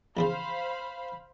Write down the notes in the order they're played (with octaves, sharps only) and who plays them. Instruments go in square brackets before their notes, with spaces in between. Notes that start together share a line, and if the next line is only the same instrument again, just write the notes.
[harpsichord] A#1 E2 C#3 [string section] C5 F5 B5